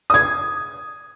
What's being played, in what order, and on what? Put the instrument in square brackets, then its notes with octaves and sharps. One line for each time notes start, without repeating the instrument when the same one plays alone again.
[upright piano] D#6 G#6